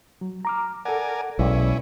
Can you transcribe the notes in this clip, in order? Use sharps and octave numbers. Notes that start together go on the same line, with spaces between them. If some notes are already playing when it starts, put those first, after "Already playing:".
F#3
A#5 D6 F6
A4 A#4 D5 F#5 G#5
B1 G#3 C#4 E4 D5